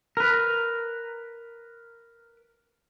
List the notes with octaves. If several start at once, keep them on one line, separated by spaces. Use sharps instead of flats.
A#4 B4